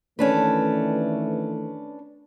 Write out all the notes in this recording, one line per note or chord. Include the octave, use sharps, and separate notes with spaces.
D#3 E3 A3 C#4 D4 B4